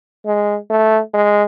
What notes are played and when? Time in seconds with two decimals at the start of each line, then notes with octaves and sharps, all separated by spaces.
0.26 G#3
0.70 A3
1.14 G#3